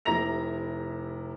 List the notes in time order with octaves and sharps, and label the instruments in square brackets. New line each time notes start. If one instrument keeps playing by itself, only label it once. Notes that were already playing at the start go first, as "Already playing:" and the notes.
[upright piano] F1 C3 E4 A#5 A#6 F7